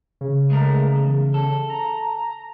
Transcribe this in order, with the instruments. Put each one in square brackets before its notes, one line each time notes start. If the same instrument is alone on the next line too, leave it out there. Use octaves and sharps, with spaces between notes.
[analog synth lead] C#3
[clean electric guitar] G#3 A3 A#4
E2
A4
[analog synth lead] A#5